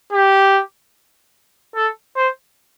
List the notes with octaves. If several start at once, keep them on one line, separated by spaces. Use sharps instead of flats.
G4
A4
C5